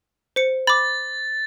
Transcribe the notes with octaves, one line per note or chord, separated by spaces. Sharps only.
C5 C#7
B5 D6 A6